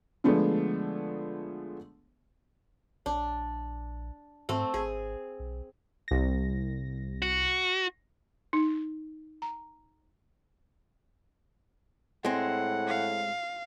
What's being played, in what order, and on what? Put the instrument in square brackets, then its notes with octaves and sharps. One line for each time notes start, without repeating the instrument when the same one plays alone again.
[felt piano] D3 F3 G#3 A3 B3 D4
[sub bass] A#1 [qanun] D4
[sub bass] G#2 [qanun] A3 C4
[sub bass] G#1 [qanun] G#4
[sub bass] B1
[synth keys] C2 A#6
[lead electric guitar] F#4
[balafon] D#4
A#5
[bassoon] A2 [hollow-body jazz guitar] G#3 C4 [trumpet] F#5
[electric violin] F5